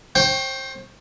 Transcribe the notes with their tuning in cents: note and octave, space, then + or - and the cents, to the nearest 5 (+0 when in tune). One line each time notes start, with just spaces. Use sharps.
C5 +35 G5 +0 C#6 -5